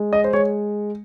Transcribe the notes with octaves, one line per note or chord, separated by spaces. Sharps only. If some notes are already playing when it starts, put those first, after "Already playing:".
Already playing: G#3
D#5
C5
G#3 C#5